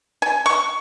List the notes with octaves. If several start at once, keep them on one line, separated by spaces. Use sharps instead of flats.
G#5
C#6